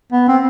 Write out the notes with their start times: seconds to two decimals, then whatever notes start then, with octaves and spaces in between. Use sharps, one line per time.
0.12 B3
0.28 C4